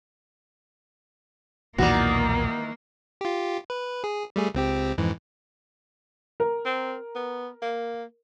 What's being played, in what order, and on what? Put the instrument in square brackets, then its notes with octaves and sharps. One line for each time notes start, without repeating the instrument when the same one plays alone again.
[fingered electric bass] B1 E2 A#2 [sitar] D#3 E3 [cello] A#3 [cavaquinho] F#4 D5
[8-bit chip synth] F4 G4
B4
G#4
G3 A3 G#4
C#2 C4 G4
F2 G#2 E3
[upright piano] A#4
[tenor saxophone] C4
B3
A#3